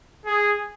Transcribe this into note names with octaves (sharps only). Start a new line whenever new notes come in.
G#4